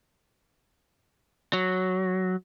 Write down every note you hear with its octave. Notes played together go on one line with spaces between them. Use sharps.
F#3